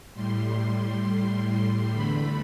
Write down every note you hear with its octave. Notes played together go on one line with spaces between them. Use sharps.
A2 G3 C6
E2 D3 A3 B5